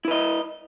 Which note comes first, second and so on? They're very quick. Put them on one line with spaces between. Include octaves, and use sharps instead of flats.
E4 B4 D#5